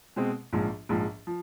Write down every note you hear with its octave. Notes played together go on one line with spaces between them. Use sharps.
B2 G#3 C4
A#1 G#2 F3
A#1 G#2 F3
F3